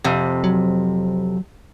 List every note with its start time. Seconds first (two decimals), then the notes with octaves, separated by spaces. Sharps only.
0.04 F2 C3
0.44 F#3